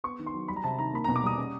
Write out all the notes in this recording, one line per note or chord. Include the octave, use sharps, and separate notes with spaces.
B3 C#6
D#3
C6
F#3
G3 B5
A#5
C3 A5
D#3 A#5
A#3 B5
A#5
B2
D6
G3 D#6
C#4